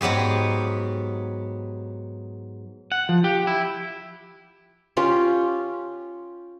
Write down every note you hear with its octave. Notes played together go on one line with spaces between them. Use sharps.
G#2 F#3 B3 G4 G#4
F#5
F3
G4
E4
C#4 F4 G4